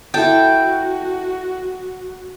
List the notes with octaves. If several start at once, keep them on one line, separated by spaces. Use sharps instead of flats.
E4 F#4 A4 G5 A5